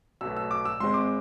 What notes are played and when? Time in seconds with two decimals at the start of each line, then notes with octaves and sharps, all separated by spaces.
0.21 B1 B2 A3 E6
0.36 E6
0.51 D6
0.65 E6
0.80 G#1 G#2 G#3 C4 C6
0.94 D6